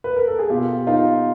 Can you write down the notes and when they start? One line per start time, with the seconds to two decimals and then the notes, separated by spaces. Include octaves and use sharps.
0.04 B4
0.16 A#4
0.28 A4
0.39 G#4
0.50 B2 F4 G4
0.87 D#4 F4